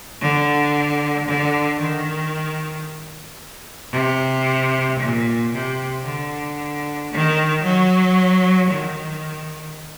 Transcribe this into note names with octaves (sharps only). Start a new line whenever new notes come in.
D3
D3
D#3
C3
A#2
C3
D3
D#3
F#3
D#3